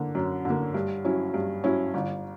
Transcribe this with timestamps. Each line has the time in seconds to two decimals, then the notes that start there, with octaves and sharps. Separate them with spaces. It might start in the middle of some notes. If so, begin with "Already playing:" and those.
Already playing: D3 A#3
0.15 F#2
0.45 D3
0.50 A#3
0.74 G2
1.05 F#3 C#4 E4
1.34 G2
1.64 F#3 C#4 E4
1.94 G1